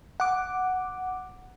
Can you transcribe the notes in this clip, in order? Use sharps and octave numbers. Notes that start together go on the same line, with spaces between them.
F#5 D6